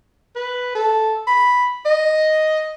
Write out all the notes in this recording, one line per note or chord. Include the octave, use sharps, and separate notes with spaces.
B4
A4
B5
D#5